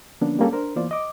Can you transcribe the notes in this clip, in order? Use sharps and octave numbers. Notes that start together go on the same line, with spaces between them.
D3 F3 A#3 B3 C#4 D4
G3 G#3 A#3 C#4 G4 A4
D4 A#4 C5
E3 A#3 B3 F4 C5 D5
D#5 D6